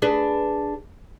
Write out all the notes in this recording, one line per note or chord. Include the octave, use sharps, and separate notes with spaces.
D4 G#4 B4